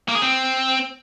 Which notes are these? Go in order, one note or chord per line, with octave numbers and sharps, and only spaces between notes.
A#3
G#4
C4